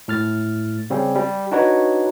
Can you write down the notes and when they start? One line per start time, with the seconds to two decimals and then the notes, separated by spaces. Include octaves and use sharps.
0.08 A2 F6 A6
0.90 C#3 G3 C4 C#4
1.16 G3
1.51 D4 D#4 F#4 B4 C#5